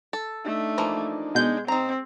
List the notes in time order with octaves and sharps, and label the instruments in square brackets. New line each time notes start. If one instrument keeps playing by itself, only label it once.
[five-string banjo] A4
[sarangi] A3 [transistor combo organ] D4 D#4
[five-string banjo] E3 F3 A#3
[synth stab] B2 G6 [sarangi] G#3
[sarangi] C4 [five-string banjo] D#4 A#5